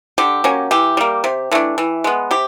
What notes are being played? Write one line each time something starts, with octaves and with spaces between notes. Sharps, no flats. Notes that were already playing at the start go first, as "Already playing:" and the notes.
D3 G4
F#3 A#3 C#4
E3 G4
G3 A#3
C3
E3 A3 D4
E3
G#3 B3
C3 G4